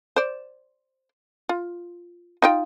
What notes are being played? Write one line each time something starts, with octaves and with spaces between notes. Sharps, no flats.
C5 D5
F4
D#4 F4 G5